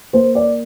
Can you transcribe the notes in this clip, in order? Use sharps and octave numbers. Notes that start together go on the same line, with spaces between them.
A#3 C5
D5